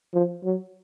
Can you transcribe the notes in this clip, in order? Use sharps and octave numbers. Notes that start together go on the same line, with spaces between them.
F3
F#3